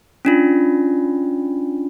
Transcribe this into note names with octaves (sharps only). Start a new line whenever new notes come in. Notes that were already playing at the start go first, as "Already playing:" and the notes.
C#4 D4 F4